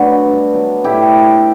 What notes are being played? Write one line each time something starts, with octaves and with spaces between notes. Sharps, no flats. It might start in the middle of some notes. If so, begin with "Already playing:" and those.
Already playing: F#3 A3 B3 D4 F#4 A4 B4
G2
F#3 B3
A2 E4 G4